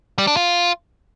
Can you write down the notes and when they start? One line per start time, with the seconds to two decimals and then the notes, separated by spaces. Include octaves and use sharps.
0.18 G3
0.27 D4
0.37 F4